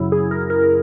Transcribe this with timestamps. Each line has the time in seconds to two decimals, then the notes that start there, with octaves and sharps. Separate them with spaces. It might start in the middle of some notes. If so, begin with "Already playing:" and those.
Already playing: F#2 C#3 F#3 E4
0.12 G#4
0.31 A#4
0.50 A#4